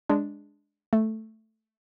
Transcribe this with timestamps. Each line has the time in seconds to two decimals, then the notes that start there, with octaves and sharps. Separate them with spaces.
0.09 G#3 D4
0.93 A3